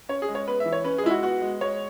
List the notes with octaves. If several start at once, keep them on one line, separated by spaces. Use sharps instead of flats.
C#4 C#5
G#4
G#3
C#5
B3 B4
E5
E3
C#5
C#4 B4
G#4
G#3 E4
F#4
B3 F#4
G#3
G#3 C#5